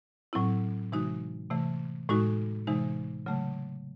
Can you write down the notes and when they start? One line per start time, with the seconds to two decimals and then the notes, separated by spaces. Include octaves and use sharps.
0.33 A2 F#3 C4 E4
0.92 C3 E3 G#3 D#4 F#4
1.50 C3 E3 A3
2.09 A2 G#3 D#4 F#4
2.67 C3 E3 G#3 D#4
3.26 C#3 F#3 A3